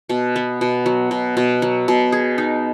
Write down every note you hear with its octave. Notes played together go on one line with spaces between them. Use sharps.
B2
B3
B2
F#3
B2
B2
F#3
B2
G#4
D#4